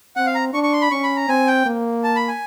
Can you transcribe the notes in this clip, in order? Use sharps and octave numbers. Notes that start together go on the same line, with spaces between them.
C4 F#5
F5
A#5
D4 C#6
C#6
C6
B5
C#4 C#6
B5
A#5
C4 G#5
G5
A#3
A5
B5
G#5